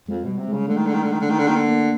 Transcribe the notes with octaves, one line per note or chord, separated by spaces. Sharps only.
F2 G#3
B2 G3
C3
G#3
C#3
D3 A3
D#3
D3
D#3
D3
D#3
D3
D#3 A3
D3
D#3 A#3
D3
A#3